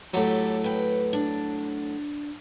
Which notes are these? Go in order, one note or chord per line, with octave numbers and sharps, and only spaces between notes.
A2 F#3 E4 G4 A4
B4 G5
D4